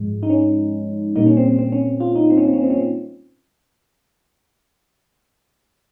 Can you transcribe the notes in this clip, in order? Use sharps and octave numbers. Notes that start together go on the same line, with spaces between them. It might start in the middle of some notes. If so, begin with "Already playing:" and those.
Already playing: G#2 F3 G#3
D#4
C#4
A#2 G3 A#3 D#4
C#4
C4
C4
C4
C#4
F4
D#4
C4
C#4
C4
C#4
C4
C#4
C4